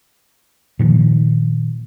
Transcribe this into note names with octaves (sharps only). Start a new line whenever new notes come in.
A#2 D#3 F3